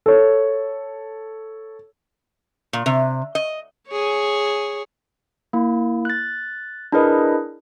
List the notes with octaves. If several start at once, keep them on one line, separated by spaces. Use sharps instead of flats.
A4 C#5
A#2
C3
D#5
G#4 C#5
A#3 E4
F#6 A6
D4 E4 G#4 A#4 B4 D#5